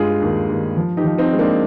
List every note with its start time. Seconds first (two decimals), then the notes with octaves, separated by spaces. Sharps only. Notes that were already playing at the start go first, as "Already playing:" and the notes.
Already playing: G2 G#3 F4 G#4
0.22 D#2
0.49 D#2
0.77 F3
0.97 D#4 G4
1.04 F3
1.18 C4 D#4
1.33 G#3
1.39 A#3 D4